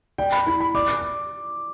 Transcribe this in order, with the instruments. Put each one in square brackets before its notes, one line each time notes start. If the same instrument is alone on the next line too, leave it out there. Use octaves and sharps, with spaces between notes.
[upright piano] D5 [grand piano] G5
[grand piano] B5
[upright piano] E4 [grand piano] B5
[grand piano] B5
[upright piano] D5 [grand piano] D6